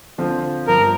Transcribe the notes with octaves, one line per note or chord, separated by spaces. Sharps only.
D3 F3 C4 F4
G1 G2 F3 A#4